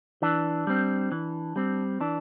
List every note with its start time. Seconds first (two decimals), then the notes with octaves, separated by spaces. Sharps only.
0.22 E3 D4
0.67 G3 C4
1.12 E3
1.56 G3 C4
2.01 E3 D4